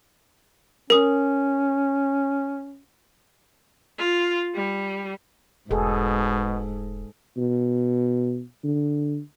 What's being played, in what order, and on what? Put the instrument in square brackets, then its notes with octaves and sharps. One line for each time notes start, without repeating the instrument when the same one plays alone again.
[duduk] C#4 [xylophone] A#4 D#6
[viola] F4
G3
[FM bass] E1 [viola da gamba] G#2 [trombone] B2 [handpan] G#4 A4
[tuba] B2
D3